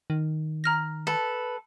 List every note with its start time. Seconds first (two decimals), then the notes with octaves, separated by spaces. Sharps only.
0.10 D#3
0.64 A#5 F6 A#6
1.07 A4 B4